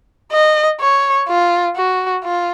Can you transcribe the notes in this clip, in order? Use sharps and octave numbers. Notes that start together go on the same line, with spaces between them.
D#5
C#5
F4
F#4
F4